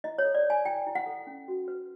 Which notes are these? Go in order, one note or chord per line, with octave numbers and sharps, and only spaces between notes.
E4 D#5
C#5
A4
D5
C#5
G#5
E4 G5
E4
F#5
A4
C#4
F#4
B4